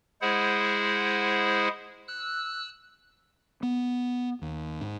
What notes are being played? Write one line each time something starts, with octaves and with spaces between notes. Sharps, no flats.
G#3 E4 G#4 C5 F#5
E6 F#6
B3
D#2
G#2